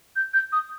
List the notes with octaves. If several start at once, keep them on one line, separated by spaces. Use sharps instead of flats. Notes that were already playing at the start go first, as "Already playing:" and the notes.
G6
G6
D#6